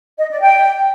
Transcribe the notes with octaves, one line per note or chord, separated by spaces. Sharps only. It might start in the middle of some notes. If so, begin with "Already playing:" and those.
D#5
D5
G5